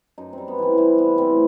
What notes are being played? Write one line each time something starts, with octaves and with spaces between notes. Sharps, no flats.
F#2 D#4
G3 C4
B3
E3 C4
G3 E4
B3
A2 C4